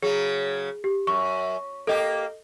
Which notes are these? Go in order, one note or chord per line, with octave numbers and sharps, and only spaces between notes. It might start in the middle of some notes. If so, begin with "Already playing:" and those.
C#3 F#3 G#4
G4
F#2 C#6
A#3 G4 A4 D#5